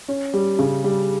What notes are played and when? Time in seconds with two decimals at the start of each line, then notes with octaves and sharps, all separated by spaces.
0.08 C#4
0.34 G3
0.59 C#3
0.84 G3